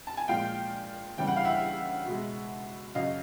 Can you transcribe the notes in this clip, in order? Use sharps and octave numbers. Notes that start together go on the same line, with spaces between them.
A5
G#5
A#2 F3 G#3 F5 G5
E2 C#3 E3 G3 G5
F#5
F5
E5 F#5
B2 G#3
F#2 C#3 F#3 D#5 F5